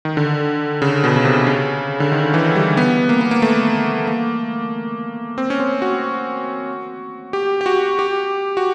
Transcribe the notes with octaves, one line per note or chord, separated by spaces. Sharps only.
D#3
D3
C#3
B2
C#3
C3
C#3
D3
D#3
E3
G3
B3
A#3
B3
A#3
A3
A#3
C4
C#4
C4
F#4
G4
G4
F#4
G4
F#4